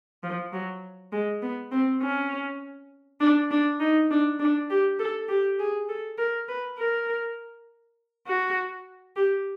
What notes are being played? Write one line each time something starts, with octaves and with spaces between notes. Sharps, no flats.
F3
F#3
G#3
B3
C4
C#4
D4
D4
D#4
D4
D4
G4
A4
G4
G#4
A4
A#4
B4
A#4
F#4
G4